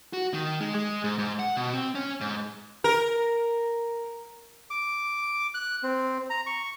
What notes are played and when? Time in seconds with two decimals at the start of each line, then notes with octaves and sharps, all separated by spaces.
0.13 F#4
0.34 D#3
0.60 G#3
0.75 G#3
1.04 G#2
1.19 G#2
1.39 F#5
1.57 B2
1.74 C4
1.95 C#4
2.21 G#2
2.84 A#4
4.70 D6
5.54 F#6
5.83 C4
6.30 A#5
6.46 C#6